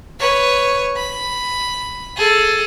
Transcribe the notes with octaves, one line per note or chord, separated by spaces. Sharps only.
B4 C#5
B5
G#4 A4